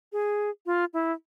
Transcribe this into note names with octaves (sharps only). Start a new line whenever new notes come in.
G#4
F4
E4